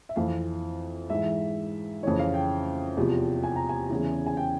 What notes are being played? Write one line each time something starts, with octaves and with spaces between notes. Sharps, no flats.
E5
F2 E3 F5
G#2 E3 E5
F2 C#3 E3 C#5
F5
G5
E2 C3 F3
G#5
A#5
G#5
E2 C#3 E3
G#5
G5